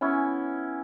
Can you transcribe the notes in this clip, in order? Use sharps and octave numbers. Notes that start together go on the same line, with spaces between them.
B3 C#4 E4 G#5